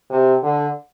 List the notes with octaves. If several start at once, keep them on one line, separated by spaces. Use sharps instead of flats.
C3
D3